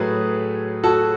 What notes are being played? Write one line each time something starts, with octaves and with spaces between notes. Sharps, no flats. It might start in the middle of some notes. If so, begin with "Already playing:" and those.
Already playing: A2 F#3 A3 G#4 B4
F#4 A4